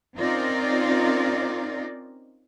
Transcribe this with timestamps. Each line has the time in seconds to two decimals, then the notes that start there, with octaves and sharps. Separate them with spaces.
0.17 C4 C#4 D#4 F4 A#4 D5